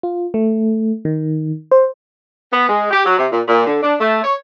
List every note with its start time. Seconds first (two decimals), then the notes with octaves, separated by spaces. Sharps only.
0.03 F4
0.34 A3
1.05 D#3
1.71 C5
2.52 B3
2.69 G#3
2.91 G4
3.05 F#3
3.17 C3
3.32 A#2
3.47 A#2
3.66 D3
3.82 D4
4.00 A3
4.23 C#5